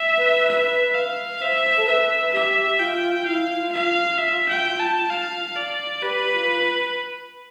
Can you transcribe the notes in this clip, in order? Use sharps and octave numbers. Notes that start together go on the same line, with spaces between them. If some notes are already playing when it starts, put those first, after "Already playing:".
Already playing: E5
B4
E5
F5
C5 E5
A4
B4 E5
G4 E5
F4 G5
E4 F5
F4
F5
F4
E5
G5
A5
F5
D5
G4 B4
F4